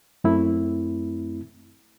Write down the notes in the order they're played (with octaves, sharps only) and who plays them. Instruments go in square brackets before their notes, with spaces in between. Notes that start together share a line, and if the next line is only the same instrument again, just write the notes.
[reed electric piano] F#2 A3 C4 E4